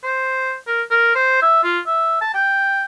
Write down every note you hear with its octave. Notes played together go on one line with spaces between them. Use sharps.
C5
A#4
A#4
C5
E5
F4
E5
A5
G5